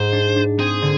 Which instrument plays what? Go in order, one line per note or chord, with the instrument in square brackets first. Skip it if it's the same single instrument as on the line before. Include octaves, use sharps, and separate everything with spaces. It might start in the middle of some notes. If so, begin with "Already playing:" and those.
Already playing: [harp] G#2 [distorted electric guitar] C5
[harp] D4
D4
[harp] C4 [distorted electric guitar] G#4
[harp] D3